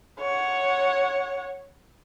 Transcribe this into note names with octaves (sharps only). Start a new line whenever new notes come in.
C#5 F#5